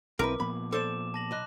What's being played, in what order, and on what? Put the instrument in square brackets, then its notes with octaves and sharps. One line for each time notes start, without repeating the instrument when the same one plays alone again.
[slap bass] B1 [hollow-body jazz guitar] C4 E4 B4 [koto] A#4 [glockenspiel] D6
[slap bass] A#2 F3 B3 [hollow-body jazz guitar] B5
[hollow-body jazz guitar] A4 C5 D5 [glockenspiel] D6 E7
[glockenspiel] A5 A#6 F#7
[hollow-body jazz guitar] B1 D#5 [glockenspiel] D6 F#6